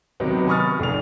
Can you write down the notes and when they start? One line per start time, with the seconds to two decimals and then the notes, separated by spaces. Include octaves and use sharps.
0.20 C3 D#3 F#3 B3
0.48 G#5 B5 C#6 D#6 F6 A6
0.79 F1 F7